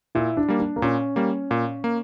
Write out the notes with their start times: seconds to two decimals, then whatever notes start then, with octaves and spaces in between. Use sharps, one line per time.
0.15 A#2 E4
0.37 D4
0.48 G3 A#3
0.59 D4
0.76 A#3
0.82 A#2 C#4
1.16 G3 A#3
1.51 A#2
1.84 A#3